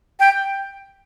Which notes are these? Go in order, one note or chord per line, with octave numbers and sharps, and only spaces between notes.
G5